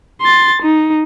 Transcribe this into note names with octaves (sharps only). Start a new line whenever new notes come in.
C6 A6
D#4